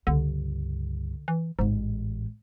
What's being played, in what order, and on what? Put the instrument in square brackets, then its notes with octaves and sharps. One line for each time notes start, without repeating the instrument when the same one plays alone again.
[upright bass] C#2 G2 [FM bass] D3
[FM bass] E3
[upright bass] A1 G#3 [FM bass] G#2